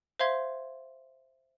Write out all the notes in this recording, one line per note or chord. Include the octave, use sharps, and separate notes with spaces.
C5 E5 F5 C6 G#6